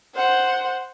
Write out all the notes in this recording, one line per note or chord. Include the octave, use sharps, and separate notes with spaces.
C5 F#5